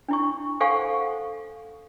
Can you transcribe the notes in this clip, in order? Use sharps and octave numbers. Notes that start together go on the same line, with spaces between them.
D4 E4 C#6
A4 C5 F5 F#5 G#5 C#6